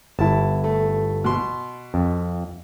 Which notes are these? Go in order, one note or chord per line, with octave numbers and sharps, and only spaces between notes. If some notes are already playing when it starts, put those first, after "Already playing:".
G1 E4 A5
A3
B2 C6
F2